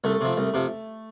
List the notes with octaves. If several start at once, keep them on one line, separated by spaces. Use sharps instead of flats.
C2 A3
C3 F3
C2
C3 F3